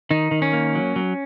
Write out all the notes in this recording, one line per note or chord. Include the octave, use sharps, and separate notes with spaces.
D#3 D#4
D#3
C#4
A#3
F#3
F#3